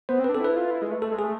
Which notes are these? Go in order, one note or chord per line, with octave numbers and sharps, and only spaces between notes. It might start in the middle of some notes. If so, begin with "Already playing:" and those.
B3 C5
C4
B4
D4
A4
E4 B4
F4
E4
G#3
A3
A3 A4
G#3
A3 G#4